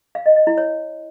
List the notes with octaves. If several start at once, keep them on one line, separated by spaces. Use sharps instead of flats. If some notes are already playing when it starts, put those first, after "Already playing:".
F5
D#5
D#5
E4
C#5